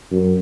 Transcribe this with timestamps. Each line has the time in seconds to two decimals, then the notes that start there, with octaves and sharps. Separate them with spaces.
0.12 F#2